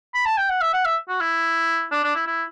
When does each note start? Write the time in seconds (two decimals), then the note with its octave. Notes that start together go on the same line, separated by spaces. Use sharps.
0.14 B5
0.26 A5
0.37 G5
0.49 F#5
0.61 E5
0.73 F#5
0.85 E5
1.08 F#4
1.20 E4
1.91 D4
2.03 D4
2.15 E4
2.27 E4